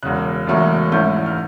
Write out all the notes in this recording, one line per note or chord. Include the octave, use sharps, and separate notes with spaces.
E1 E2 C#3 F#6
E1 E2 C#3 F#3 A3
A#1 G#2 E3 A3 C#4 G6
F6